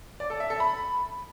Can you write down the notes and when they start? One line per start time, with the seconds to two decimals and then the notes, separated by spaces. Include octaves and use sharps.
0.20 D5
0.30 A4
0.40 E5
0.50 A4
0.60 B5